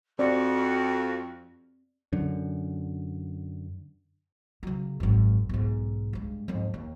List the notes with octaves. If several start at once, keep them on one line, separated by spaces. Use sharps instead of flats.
F2 C4 F#4 D5
F#2 D3
C#3 F#3
G#1 F#2
B1 G#2
G2 G#3
F2 G#2
D#2